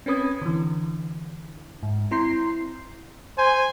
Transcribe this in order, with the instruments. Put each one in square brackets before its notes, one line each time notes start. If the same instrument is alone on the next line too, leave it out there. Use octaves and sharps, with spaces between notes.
[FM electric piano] C4 C#4 B4 D#6 G#6
D3 E3
G#2
C4 E4 A#5 C6 G6 C7
[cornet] C5 [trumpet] G#5